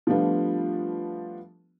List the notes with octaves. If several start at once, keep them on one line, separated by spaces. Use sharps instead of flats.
F3 G3 A3 B3 D4 F4